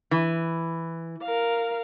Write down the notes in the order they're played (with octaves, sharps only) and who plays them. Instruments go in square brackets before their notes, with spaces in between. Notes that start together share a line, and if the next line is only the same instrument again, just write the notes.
[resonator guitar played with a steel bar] E3
[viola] A#4 F5